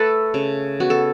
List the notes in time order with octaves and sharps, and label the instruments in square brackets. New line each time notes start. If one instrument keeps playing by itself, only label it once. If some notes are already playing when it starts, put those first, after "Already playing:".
Already playing: [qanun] A3 A4 B4
C#3
B3 F#4
A4